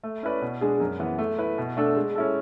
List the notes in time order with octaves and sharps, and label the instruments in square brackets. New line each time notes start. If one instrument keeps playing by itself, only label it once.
[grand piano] A3
C#4 E4 B4 D5
B2
G#3 D4 G#4
F#2
E3 B3
A3
E4 B4
B2
A3 D4 A4
G#3
C#4 E4 A4